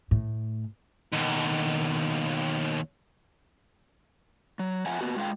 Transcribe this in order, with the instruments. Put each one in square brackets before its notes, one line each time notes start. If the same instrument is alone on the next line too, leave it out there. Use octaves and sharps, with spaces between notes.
[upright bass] A2
[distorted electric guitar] D#2 B2
[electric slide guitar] F#3
F2 F3 E5 F#5 G#5
A#3 B3 F#4
G#3 F4 F5 G5